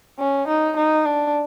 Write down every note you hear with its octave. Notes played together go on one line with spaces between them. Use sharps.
C#4
D#4
D#4
D4